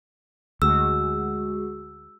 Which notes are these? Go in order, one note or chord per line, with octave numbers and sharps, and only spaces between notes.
D2 G#3 F#4 G#4 E6